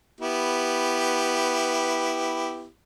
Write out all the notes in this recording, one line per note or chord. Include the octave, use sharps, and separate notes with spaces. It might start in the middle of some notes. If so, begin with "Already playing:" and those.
B3 E4 G4